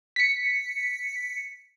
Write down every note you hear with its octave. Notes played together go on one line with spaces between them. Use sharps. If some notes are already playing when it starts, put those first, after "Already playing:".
B6 C#7